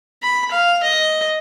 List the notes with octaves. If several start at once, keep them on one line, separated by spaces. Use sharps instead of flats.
B5
F5
D#5